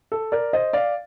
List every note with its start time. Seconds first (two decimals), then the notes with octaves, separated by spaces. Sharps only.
0.12 A4
0.32 A#4 D5
0.53 C5 D#5
0.73 D5 F5